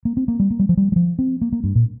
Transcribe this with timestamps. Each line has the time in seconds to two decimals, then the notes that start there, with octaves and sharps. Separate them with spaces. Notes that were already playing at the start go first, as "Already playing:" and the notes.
0.05 A#3
0.17 C4
0.28 A#3
0.40 G3
0.50 A#3
0.59 G3
0.69 F3
0.77 G3
0.92 G3
0.96 F3
1.19 C4
1.41 A#3
1.52 A#3
1.64 G2
1.75 A#2